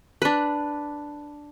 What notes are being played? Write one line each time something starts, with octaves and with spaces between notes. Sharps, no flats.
D4 B4